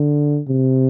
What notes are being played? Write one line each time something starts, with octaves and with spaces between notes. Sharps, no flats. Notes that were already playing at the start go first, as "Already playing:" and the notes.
Already playing: D3
C3